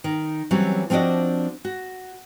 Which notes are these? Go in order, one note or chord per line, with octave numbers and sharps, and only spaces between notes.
D#3
E3 F#3 G3 C4 C#4
F3 C4 D4 F#4 D5 D#5
F#4